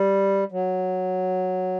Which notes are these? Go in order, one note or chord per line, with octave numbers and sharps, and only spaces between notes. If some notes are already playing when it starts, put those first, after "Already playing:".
Already playing: G3
F#3